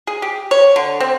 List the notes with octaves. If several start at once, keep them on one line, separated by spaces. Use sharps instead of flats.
G#4
G4
C#5
D3
C4